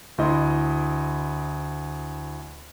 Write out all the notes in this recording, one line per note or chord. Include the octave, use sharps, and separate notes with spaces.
D2 E4 D#5 C6